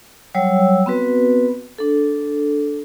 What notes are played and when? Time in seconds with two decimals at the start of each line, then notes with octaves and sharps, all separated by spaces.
0.35 F#3 G3 C#5 G5 E6
0.86 B3 C4 F#4 B4
1.78 D4 A4